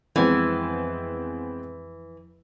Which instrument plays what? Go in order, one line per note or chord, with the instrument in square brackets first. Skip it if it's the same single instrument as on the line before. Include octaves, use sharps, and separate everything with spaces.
[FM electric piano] F2 [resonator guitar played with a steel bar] E3 [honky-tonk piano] G#3 B3 C4